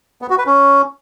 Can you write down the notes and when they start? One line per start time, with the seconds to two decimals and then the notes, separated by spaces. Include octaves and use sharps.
0.22 B3
0.30 F#4
0.38 B4
0.46 C#4